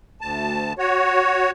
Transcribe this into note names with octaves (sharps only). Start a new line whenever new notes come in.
D2 A5
F#4 C#5